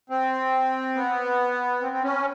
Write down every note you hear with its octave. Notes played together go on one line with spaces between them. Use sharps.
C4
B3
C4
C4
C#4